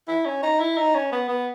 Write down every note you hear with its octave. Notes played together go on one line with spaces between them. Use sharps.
E4
C#4
D#4
E4
D#4
C#4
B3
B3